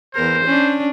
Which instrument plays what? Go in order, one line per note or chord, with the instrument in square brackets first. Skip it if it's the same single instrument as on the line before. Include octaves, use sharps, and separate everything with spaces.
[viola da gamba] E2 A#4 [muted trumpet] C5
[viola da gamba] C#4 D4